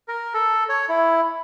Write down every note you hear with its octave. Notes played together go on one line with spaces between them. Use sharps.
A#4
A4
C#5
E4